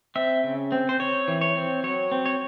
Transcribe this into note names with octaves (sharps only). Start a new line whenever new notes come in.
C4 E5
C#3
C4
C5
C4 C#5
E3
C#5
C4
F#3 C#5
C4
C#5